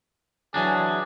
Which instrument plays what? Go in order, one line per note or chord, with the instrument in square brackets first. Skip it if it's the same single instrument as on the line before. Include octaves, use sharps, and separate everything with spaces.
[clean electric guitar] E3 F#3 D4 [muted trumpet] G#4